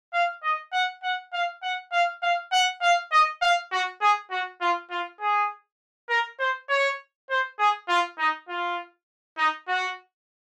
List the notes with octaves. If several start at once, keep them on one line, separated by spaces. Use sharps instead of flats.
F5
D#5
F#5
F#5
F5
F#5
F5
F5
F#5
F5
D#5
F5
F#4
G#4
F#4
F4
F4
G#4
A#4
C5
C#5
C5
G#4
F4
D#4
F4
D#4
F#4